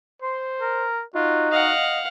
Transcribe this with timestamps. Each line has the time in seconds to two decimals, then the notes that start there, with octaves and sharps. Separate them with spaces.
0.22 C5 C6
0.61 A#4
1.15 D#4 F4 F#4
1.52 D#5 F5 F#5